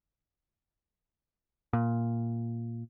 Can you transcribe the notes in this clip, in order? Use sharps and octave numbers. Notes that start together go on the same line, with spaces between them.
A#2